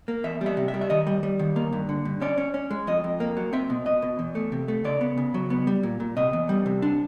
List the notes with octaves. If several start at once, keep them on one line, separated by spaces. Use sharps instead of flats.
A#3
E2 E5
G3
E5
C3
E5
G3
E5
D#3 D#5
G3
G3
D#3
A#3
G2
D3
G2
C#4 D5
C#4
C#4
G#3
F2 D#5
F2
A#3
F#3
C4 E5
B2
B2 D#5
B2
E2
A3
C3
A3
C#3 D5
B3
C#3
F#3
B3
G3
A#2
A#2
C3 D#5
E2
G3
C3
D4